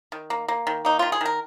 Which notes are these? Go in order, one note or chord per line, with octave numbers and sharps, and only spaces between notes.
D#3
A#3
A#3
D#3
A#3 D#4
D#3 F4
G#4
D#3 A#4